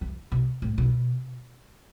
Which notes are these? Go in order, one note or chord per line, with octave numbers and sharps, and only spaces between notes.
E3
B2
A2
B2